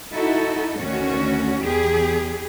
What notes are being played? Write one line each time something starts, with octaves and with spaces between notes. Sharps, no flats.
D#4 E4 F#4 A4
D2 D#3 C#4 F#4
E2 G4 G#4